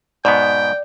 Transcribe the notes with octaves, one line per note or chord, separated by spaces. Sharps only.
G#2 B2 B3 D5 G5